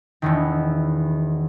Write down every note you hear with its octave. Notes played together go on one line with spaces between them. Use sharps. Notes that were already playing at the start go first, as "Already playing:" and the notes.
E1 E2 D#3